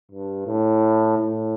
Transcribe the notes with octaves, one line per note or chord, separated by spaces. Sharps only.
G2
A2
A2